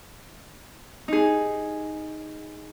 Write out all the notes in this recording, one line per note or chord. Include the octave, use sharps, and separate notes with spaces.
D#4 G#4